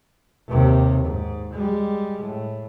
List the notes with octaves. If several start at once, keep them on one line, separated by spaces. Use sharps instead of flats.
D#2 C3
G#2
G3 G#3
A2